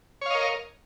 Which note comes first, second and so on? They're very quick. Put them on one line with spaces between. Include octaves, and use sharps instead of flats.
C#5 F5 D#5 A#4